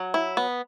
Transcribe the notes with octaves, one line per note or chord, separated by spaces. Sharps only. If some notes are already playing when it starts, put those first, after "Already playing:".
Already playing: F#3
E4
B3